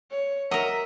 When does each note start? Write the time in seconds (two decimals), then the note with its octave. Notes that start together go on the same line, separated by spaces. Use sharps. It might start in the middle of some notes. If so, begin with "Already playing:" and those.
0.11 C#5
0.51 F#3 A#4 D#5 E5